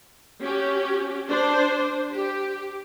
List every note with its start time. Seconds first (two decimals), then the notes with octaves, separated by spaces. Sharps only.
0.43 C#4 F#4 G4
1.29 D4 C5
2.14 G4